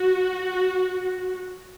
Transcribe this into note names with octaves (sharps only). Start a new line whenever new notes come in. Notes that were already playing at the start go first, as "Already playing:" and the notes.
Already playing: F#4